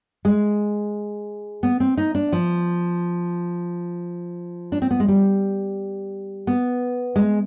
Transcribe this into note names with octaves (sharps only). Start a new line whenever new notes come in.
G#3
B3
C4
D#4
D4
F3
D4
C4
B3
G#3
G3
B3
G#3